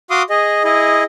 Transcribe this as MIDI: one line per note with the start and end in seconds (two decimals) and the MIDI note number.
0.10 0.23 66
0.10 0.23 77
0.10 0.23 84
0.10 0.23 86
0.10 0.23 87
0.30 0.64 68
0.30 0.64 75
0.64 1.04 64
0.64 1.04 68
0.64 1.04 75